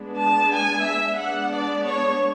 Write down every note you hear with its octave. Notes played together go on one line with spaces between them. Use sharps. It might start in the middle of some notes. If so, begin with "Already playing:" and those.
Already playing: G#3 B3 D4
A5
G#5
E5
G#3 B3 D4 F#5
D5
C#5